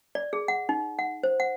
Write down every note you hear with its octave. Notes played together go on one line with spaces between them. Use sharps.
D5
G#4
F#5
D#4
F#5
C5
F#5